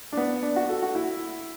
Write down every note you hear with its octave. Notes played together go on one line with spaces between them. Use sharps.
D4
B3
D4
F#4
A4
F#4
E4